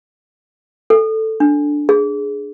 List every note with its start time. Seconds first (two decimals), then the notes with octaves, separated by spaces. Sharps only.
0.90 A4
1.40 D4
1.89 G#4